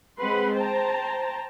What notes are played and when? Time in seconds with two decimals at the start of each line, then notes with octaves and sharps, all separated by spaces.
0.20 G#3 C4 B4 F#5 B5 C6
0.56 C5 G5 A5 A#5